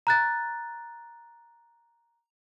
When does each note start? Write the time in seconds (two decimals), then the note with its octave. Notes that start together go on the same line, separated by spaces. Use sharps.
0.07 A#5 F#6 A6